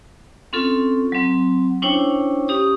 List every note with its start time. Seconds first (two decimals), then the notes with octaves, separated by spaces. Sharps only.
0.53 C4 C#4 F4 A4
1.12 F#3 C4
1.82 C#4 D4 E4 C5 C#5 G5
2.48 C#4 G4 D#6